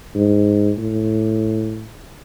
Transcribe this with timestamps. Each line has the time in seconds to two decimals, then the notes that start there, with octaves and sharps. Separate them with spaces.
0.16 G#2
0.78 A2